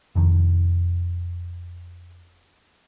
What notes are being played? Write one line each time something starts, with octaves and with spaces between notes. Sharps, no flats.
F1 F2 D#3